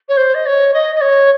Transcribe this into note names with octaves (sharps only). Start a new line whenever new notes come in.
C#5
C5
D#5
C#5
D#5
D#5
C#5